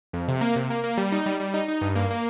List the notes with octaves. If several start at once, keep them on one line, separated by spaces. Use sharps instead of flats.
F2
C3
A#3
C3
A#3
A#3
G3
D#4
G3
G3
D#4
D#4
G2
A#3
A#3